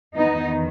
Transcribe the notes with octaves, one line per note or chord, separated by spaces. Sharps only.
E2 D#3 B3 D#4